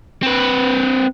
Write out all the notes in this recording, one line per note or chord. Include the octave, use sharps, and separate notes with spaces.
C4 B4